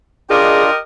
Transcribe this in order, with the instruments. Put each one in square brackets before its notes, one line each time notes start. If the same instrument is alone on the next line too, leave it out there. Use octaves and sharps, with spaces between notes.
[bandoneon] D4 F4 [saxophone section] G4 A#4 D#5 [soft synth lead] G#4